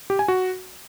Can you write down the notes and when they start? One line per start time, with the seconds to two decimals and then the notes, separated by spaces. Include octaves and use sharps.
0.10 G4
0.19 G#5
0.28 F#4